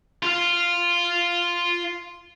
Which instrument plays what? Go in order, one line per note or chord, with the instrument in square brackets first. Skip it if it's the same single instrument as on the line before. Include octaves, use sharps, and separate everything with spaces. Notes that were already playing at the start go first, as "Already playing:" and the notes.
[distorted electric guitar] F4 F5